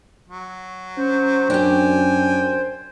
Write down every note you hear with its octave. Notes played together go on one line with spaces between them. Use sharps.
F#3
C#4 C5
F#2 D4 G4 G5 G#5